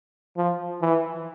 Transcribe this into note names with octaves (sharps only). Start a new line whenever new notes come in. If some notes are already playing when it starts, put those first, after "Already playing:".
F3
E3